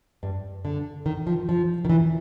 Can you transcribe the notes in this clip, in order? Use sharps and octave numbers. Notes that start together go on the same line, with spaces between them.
G2
D3
D#3
F3
F3
D#3
E3